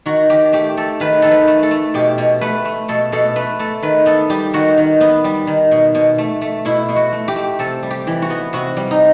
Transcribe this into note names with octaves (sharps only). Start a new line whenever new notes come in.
D#3 F#4
D#3 G4
A3 G4
A3 A4
D#3 B4
D#3 A4
B4
A3
A4
A3
B2 G4
B2
A3 B4
A3
B2 A4
B2 A4
A3 B4
A3 A4
D#3 B4
B3 A4
G3 G4
D#3 F#4
D#3
B3
G3
D#3
B2
B2
A3
A3
B2 E4
B2
F#4
A3
G4
A3
C3 A4
G3
G4
E3
F#4
B3
C3 F#4
G3
D#4